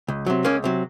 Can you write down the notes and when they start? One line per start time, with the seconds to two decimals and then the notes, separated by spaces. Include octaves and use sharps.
0.08 C#2
0.26 C3 F#3
0.44 C#2 A#3 C#4
0.64 C3 F#3